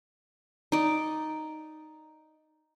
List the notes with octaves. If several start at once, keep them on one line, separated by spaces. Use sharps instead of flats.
D#4 D5